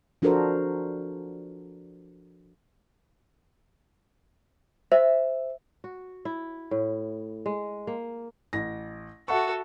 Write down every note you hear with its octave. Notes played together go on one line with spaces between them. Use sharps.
F3 D4 F#4 A4 A#4 C5
C5 E5
F#4
E4
A2
G#3
A#3
A1 A#6
F#4 A4 E5 F#5 C#6